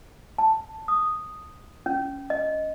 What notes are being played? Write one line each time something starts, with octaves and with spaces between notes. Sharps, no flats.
A5
D#6
C#4
D#5